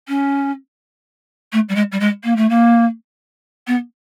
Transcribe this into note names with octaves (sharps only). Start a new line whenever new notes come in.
C#4
A3
G3
G#3
G3
G#3
A#3
A3
A#3
B3